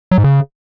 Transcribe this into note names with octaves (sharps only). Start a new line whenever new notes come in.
F#3
G#2
C#3